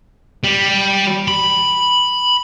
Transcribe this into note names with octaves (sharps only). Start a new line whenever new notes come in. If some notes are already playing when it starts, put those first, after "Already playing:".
G3
B5